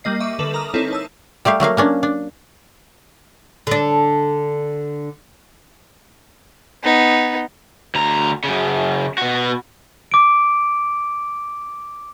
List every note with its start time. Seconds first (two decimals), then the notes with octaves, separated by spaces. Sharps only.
0.04 G3 A#3 D#5 C7
0.20 E5 C#6 D6 D#7
0.39 D3 A4 B4 E7 F#7
0.54 A#4 A#5 D6 D#6 F6
0.74 C4 D#4 E4 A4 C#5
0.91 C#5 A5 E6
1.45 G3 A3 G4 F5
1.60 F#3 A3 A#3 F5
1.77 A#3 C#4 D4
2.03 D4
3.67 D3 D4
6.84 B3 D#4
7.95 D2 A#5
8.44 F#2 C#3
9.18 B2 F#4
10.12 D6 D7